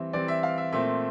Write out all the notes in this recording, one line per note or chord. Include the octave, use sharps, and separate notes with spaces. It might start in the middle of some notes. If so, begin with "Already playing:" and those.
Already playing: E3 G3 C4 E5
E3 G3 C4 D5
E5
F5
E5
A#2 A3 C4 E5